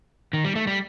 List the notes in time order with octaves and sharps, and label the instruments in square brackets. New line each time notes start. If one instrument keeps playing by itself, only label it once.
[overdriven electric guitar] D#3
G3
A3
G3